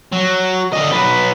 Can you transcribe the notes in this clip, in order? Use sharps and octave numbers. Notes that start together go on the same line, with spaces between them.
F#3
D3 D#5
F#3 B4